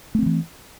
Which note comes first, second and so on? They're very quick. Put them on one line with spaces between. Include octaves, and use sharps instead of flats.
A3 C4 F3 E3